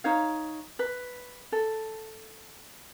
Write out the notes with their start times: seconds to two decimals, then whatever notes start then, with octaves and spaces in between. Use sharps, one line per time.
0.04 D#4 C#5 F5
0.79 B4
1.52 A4